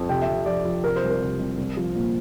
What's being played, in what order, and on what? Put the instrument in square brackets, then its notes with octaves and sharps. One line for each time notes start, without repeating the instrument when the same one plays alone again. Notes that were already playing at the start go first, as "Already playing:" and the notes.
Already playing: [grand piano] F2
C3 G5
E5
C3
F3 D5
F3
C3 A#4
C5
C2
A#4
C3
C2
C2
F3
A#2